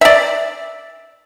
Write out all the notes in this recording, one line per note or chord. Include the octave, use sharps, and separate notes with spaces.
D5 E5